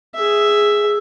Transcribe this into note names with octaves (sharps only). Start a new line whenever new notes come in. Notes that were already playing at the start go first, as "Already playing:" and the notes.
G#4 E5